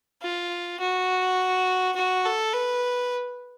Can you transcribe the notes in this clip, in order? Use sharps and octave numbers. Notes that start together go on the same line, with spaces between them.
F4
F#4
F#4
A4
B4